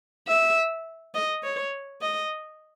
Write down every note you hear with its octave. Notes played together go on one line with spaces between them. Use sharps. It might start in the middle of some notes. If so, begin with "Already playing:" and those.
E5
D#5
C#5
D#5